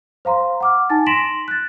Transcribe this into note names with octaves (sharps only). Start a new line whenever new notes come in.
C5 F5 A#5 C6
F#5 D6 F6
D#4 G#5 A5 A6
C6 A#6 B6 D7 E7 F#7
F#6 A6